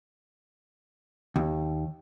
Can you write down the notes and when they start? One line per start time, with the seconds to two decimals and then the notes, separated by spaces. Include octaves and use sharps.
1.36 D#2